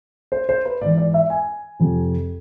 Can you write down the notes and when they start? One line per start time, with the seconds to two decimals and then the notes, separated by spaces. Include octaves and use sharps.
0.32 C5
0.49 C5
0.65 B4
0.81 G#2 E3 D5
0.97 D5
1.14 E5
1.30 G#5
1.79 F2 C3 F3